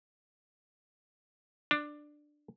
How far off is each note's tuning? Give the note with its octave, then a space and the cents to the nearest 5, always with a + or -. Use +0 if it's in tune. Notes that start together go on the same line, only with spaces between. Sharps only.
D4 +10